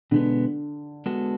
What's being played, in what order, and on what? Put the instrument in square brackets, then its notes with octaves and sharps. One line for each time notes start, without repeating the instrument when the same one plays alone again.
[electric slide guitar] B2 G#3 B3 [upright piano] D3
[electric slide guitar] G#3 B3 F#4 A4